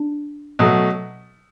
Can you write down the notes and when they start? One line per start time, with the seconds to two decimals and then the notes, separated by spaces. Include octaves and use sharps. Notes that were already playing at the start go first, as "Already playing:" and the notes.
Already playing: D4
0.59 B2 F#3 A3